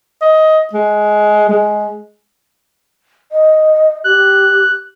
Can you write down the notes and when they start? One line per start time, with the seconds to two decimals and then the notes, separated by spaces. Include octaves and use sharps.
0.22 D#5
0.73 G#3
1.49 G#3
3.32 D#5
4.04 G4 F#6